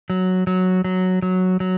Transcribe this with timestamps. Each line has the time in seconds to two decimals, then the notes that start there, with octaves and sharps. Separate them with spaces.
0.10 F#3
0.47 F#3
0.84 F#3
1.22 F#3
1.60 F#3